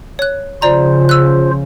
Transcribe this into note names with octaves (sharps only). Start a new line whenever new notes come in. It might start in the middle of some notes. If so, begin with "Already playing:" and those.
C#5 F#6
C#3 F3 F4 C5 D5 A#5
E6 F#6